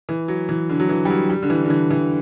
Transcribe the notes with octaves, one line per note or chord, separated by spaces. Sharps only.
E3
F#3
E3
D3
F#3
E3
G3
F#3
G3
D3
E3
D3
E3
E3